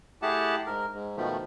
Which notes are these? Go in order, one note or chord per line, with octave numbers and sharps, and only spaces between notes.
A3 E4 G4 G#4 F#5 A5
G#2 A#4
G#2
B2 D#3 F3 A3